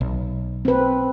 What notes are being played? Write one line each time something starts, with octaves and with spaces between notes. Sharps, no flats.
B1
C4 B4